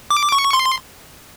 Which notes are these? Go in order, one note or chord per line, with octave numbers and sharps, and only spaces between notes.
D6
C#6
C6